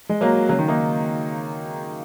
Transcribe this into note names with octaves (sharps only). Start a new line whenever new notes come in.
G#3
F#3 A#3
C#3 F#3
D#3
A#3 D#4